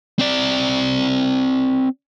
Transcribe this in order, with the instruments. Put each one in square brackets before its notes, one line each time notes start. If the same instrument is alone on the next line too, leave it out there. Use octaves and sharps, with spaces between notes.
[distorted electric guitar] C4 D5